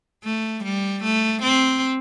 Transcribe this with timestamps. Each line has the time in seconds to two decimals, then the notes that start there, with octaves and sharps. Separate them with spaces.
0.24 A3
0.64 G3
1.03 A3
1.42 C4